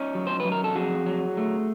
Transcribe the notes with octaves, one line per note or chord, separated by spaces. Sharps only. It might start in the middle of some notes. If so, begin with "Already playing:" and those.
Already playing: C#4 D#4
F#3
C5
B4
F#3
A#4
A4
F2 F#4 G#4
F#3
A3